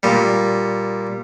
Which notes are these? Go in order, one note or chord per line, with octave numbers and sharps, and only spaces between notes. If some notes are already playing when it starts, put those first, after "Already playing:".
A#2 G3